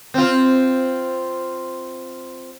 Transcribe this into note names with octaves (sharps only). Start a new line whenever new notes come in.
C4 F4